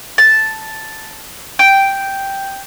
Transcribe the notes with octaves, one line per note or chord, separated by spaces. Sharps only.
A5
G5